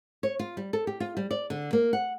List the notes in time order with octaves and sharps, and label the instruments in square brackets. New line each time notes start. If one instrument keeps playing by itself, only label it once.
[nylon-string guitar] C#5
F4
G3
A4
G4
F4
G3
D5
D3
A#3
F#5